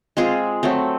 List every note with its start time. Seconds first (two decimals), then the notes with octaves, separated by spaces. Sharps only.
0.17 G#3 C4 F4 G#4
0.63 F#3 A3 C4